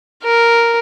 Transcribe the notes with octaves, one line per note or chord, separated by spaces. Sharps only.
A#4